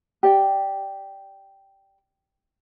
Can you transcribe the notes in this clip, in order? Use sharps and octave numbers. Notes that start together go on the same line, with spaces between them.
G4 D5 G5